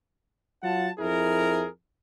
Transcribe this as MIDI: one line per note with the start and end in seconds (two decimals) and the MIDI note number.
0.63 0.89 54
0.63 0.89 65
0.63 0.89 78
0.63 0.89 81
0.99 1.67 41
0.99 1.67 64
0.99 1.67 68
0.99 1.67 70